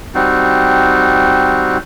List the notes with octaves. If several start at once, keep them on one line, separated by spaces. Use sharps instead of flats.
G3 C4 D#4 F#4